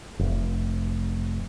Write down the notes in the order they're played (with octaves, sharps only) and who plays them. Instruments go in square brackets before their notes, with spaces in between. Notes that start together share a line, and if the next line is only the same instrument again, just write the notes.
[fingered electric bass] F1